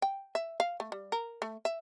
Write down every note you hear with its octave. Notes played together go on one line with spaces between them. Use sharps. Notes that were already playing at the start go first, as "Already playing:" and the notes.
G5
E5
F5
A3
G3
A#4
A3
E5